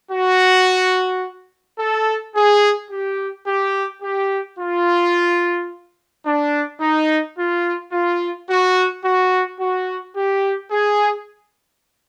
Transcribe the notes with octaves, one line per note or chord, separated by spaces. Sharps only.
F#4
A4
G#4
G4
G4
G4
F4
D4
D#4
F4
F4
F#4
F#4
F#4
G4
G#4